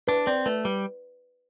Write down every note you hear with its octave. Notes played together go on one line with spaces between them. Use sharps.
D4 B4
C4 D5
A3 B4
G3 B4